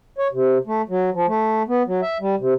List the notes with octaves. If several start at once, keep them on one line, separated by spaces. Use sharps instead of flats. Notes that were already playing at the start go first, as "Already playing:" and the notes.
C#5
C3
A3
F#3
F3
A3
B3
F#3
E5
G3
C3